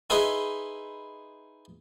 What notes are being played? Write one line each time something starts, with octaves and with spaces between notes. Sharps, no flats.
D#4 E4 G#4 B4 B5 C6